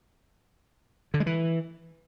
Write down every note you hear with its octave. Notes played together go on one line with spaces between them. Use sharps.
D3
G#3
E3